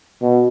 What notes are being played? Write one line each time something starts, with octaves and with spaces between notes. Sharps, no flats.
B2